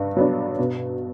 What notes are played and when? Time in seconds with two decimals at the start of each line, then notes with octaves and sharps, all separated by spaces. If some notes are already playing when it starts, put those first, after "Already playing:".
Already playing: G2 D4
0.17 F#3 B3 D4
0.58 B2